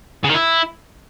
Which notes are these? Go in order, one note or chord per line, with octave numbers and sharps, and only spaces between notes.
C#3
D#3
E4